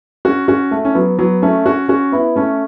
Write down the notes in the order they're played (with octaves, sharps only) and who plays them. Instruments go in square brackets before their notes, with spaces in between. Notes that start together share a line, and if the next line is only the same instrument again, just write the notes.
[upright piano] C#4 F#4
C#4 F#4
A3
C#4
F#3 B3
F#3 B3
A3 C#4
C#4 F#4
C#4 F#4
B3 E4
A3 C#4